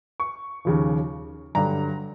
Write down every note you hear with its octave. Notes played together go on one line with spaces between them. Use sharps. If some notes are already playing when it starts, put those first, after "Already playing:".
C#6
D#2 C#3 F3
G2 D3 F#3 A#5